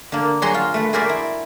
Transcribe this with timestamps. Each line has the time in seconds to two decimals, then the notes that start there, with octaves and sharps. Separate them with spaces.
0.12 D3 A#3
0.42 F#3 G3 F#4 G#4 A#5 C6
0.54 F4
0.74 A3 B4
0.93 F#4 G#4 A#4 C5 D5 E5
1.09 E4